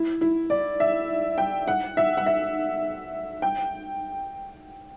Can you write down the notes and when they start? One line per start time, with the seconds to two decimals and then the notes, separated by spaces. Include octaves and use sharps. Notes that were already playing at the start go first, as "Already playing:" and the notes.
Already playing: E4
0.21 E4
0.50 D5
0.80 E5
1.38 G5
1.68 F#5
1.97 E5
2.17 F#5
2.26 E5
3.42 G5